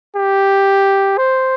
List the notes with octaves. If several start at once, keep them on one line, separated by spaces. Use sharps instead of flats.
G4
C5